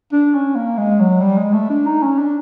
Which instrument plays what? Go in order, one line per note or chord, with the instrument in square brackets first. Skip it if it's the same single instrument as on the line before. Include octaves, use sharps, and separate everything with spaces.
[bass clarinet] D4
C#4
A#3
G#3
F#3
G3
G#3
A3
D4
D#4
C#4
D4